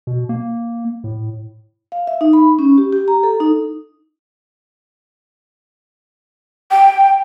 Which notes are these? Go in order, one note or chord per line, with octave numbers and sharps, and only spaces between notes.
B2
A#3
A2
F5
E5
D#4
B5
C#4
G4
G4
A#5
A4
D#4
G5